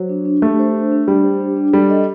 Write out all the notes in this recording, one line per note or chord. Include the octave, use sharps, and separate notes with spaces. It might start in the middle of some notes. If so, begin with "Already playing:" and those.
Already playing: F#3 C5
D4
D4
A3 G4
C5
D4
D4
G3 G4
C5
D4
D4
G3 A4
D#5